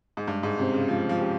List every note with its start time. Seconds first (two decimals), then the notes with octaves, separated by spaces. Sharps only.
0.17 G#2
0.27 G2 G#3
0.43 G#2
0.58 C3 C#4 G4 C5
0.74 C#3
0.89 F3 G#3
1.09 F3
1.20 C#4 G4 C5